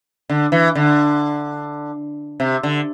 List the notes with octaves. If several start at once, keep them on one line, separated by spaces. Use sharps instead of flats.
D3
E3
D3
C3
D3